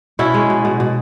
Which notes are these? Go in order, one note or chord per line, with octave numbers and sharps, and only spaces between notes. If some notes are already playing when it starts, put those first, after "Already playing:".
B2 C#4 E4
G#3
B2
B2
B2